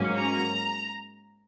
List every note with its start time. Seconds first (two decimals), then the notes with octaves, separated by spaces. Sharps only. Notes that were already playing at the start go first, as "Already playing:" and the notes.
Already playing: G#2 F#3 A#3 C#4
0.17 A#5